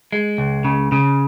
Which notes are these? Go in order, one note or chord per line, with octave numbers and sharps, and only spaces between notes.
G#3
C#2
C#3
C#3